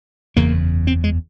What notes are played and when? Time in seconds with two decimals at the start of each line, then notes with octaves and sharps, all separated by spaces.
0.36 F#1 E2 C#3 A#3
0.87 C4
1.04 G#3